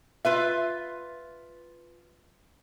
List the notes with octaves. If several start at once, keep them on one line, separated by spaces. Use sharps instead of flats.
F4 B4 E5